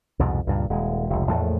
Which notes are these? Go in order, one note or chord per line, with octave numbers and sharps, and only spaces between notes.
C2 F2 G#2 B2
C#2 G2 A#2
D#1 G#3
F1 C#2
A#1 E2 A2 A3